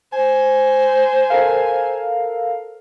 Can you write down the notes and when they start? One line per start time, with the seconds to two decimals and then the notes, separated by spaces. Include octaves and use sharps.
0.13 C5 G#5
1.30 A4 A#4 F5